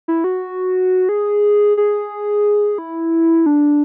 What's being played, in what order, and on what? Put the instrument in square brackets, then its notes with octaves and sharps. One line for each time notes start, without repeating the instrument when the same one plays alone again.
[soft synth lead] E4
F#4
G#4
G#4
E4
D4